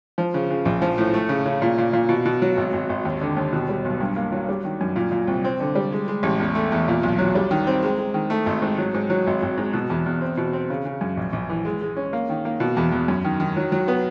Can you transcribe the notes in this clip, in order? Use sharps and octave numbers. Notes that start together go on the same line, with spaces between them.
F3
C#3
C#3
A#1
F3
A2
A3
C#3
C#3
A#2
A#2
A#2
B2
B2
F#3
G#1
G#1
G#1
D#2
D3
D#2
B2
G3
B1
G2
A#3
F#3
G3
D#3
F#2
A#2
A#2
C2
C4
D3
G3
G#3
G#3
A1
E2
A3
E2
A#2
B1
F#3
G3
D#3
C4
G#3
G#3
D#3
A3
G#1
G#2
F#3
G#2
F#3
G#1
G#1
G#2
B2
E2
E2
C4
B2
C4
C#3
C#3
F#2
A#1
A#1
E3
G#3
G#3
C#4
A#3
D#3
A#3
B2
E2
E2
F#2
D#3
D#3
F#3
F#3
B3